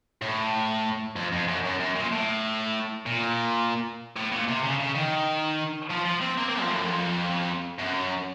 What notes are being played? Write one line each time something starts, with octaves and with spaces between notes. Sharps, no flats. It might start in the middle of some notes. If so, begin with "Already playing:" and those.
A2
F2
F2
F#2
F#2
F#2
A#2
A2
A#2
A2
A#2
C3
C#3
C#3
D#3
F3
F3
C4
A#3
C4
F3
A2
F#2
F2
F#2